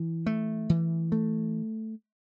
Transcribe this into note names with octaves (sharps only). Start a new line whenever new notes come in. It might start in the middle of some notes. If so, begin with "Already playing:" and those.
Already playing: E3
A3
E3
A3